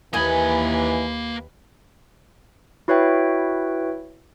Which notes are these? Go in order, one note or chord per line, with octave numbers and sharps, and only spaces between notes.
D#2 E3 A#3 B4 D#5 G#5 B5
E4 F#4 B4 C#5 E5 G5